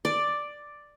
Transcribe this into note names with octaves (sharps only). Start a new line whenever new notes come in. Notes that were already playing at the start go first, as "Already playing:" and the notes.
D5